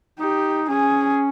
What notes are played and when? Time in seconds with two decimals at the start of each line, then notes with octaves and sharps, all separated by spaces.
0.19 D#4 G4
0.69 C#4 G#4